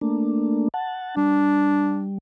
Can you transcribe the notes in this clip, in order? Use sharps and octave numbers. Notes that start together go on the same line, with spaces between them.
A3 A#3 D4
F#5 A5
G3 D4